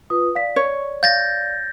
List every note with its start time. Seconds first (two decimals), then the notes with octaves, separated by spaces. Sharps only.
0.10 F4 B4 D#6
0.35 D5 F5 B6
0.56 C#5 C#6
1.03 F5 G6 A6 A#6